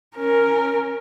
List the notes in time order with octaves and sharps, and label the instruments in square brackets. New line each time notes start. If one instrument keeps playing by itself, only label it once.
[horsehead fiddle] C#4 A#4